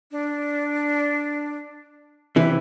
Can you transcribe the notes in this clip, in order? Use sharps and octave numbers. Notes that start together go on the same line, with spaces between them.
D4
C3 E3 E5